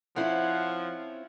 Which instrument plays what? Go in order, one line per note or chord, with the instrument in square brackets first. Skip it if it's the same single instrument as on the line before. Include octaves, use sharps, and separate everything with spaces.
[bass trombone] F3 [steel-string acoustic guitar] C4 C#4 E4 [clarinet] F#5